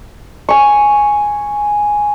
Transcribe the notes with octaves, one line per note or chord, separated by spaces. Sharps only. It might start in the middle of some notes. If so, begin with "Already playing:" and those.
G#5 C#6